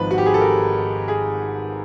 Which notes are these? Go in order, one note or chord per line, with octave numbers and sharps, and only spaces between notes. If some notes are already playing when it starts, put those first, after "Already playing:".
Already playing: G#1 G#2 F3 B4
F#4
G4
G#4
A4
A#4
G#4